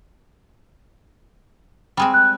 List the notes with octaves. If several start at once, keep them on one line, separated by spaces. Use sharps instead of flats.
G3 G#3 C4
F#6